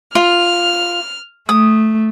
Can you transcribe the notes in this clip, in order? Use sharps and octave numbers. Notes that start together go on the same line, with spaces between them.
F4 F6
A3 D#6